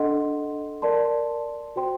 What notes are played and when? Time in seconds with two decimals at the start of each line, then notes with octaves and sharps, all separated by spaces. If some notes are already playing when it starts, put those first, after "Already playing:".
Already playing: D4 A4 D#5 F#5 C6
0.82 A#4 D5 A5 C6
1.76 F#4 C5 G5 C6